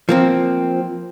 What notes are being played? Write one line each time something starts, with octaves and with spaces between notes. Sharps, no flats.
F3 A#3 C4